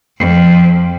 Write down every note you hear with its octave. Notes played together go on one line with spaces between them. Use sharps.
F2